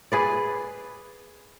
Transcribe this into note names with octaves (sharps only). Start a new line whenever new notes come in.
G#4 B4 D5